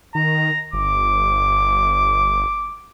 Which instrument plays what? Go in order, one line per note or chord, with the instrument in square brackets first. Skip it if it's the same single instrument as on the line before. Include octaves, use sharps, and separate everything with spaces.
[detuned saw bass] D#3 [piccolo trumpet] A#5
[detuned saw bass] G1 [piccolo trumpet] D6